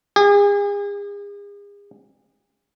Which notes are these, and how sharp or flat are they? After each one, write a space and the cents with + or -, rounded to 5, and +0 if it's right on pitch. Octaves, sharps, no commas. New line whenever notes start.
G#4 -40